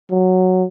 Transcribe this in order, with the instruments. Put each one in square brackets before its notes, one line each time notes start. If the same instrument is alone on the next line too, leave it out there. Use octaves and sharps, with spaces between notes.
[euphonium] F#3